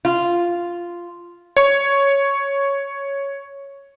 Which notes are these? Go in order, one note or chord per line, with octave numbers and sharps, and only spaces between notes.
F4
C#5 C#6